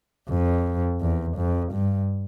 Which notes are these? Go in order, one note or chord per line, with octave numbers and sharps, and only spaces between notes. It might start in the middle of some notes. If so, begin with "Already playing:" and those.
F2
E2
F2
G2